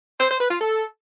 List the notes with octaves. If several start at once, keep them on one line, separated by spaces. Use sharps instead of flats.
C5
C5
B4
F4
A4